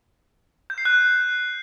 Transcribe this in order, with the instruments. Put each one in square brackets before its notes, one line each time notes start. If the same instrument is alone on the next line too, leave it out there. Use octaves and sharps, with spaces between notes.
[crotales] G6
C7
F#6